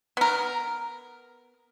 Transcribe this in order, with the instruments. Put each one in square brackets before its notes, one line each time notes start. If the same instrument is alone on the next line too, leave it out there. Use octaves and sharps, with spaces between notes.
[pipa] B3 A#4